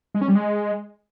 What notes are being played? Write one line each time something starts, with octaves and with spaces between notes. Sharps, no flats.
G#3
C#4
G3
G#3